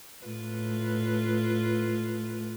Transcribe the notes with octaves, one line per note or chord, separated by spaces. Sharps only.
A2 F4 B4